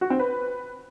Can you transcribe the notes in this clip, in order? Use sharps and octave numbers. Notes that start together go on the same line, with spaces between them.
F#4
C4
B4